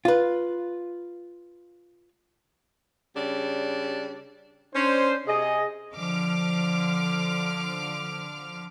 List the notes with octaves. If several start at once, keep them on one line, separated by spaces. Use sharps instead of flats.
F4 B4
C#3 G3 D4
C#4 D4 C5
C3 G#4 D#5
D3 F3 D6 F6